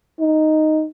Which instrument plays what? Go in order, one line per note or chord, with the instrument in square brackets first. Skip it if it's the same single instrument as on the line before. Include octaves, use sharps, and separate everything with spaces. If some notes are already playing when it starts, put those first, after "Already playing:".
[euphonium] D#4